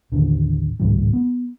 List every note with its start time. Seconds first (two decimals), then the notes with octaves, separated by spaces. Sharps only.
0.12 A1 D#2 D3
0.80 G#1 C#2 A2 G3
1.13 B3